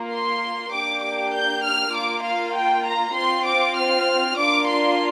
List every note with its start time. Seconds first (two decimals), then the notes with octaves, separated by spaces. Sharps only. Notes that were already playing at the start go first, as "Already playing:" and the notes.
Already playing: A#3 F4
0.12 C6
0.72 A#3 D4 G4 D6
1.03 D6
1.33 G6
1.64 F6
1.94 A#3 F4 D6
2.24 F5
2.55 G5
2.85 A#5
3.15 C4 F4 C6
3.46 D6
3.77 F6
4.38 A#3 D4 F4 D6
4.68 C6